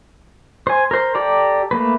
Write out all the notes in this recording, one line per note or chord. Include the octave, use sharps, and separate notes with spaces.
C5 G#5
A#4 C5
G4 A4 D5 A#5
A3 A#3 B4